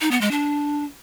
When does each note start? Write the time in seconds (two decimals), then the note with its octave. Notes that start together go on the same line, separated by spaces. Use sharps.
0.01 D#4
0.11 B3
0.21 G#3
0.31 D4